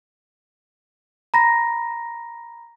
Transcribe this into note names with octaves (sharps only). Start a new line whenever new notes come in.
A#5 B5 A#6